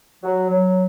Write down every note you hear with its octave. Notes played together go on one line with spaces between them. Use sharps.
F#3
F#3